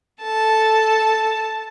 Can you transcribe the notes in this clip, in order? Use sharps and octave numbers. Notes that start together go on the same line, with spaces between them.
A4 A5